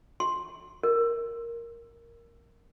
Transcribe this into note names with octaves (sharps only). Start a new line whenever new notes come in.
C6
A#4